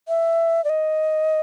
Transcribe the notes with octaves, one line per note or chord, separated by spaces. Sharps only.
E5
D5
D#5